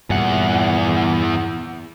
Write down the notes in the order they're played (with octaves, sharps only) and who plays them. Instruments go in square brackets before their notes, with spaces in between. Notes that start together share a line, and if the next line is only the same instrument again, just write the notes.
[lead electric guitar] E2 F#5 [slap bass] G2 A#2